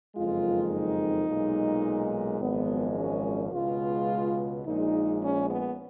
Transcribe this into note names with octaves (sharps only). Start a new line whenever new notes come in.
F#1 F2 D#3 G#3 F4
D#4
B1 A#2 G#3
G#1 F#2 F3 G#3 B3
C#4
C#2 B2 G#3 F4
A#1 A#2 G#3 D#4
C#4
B3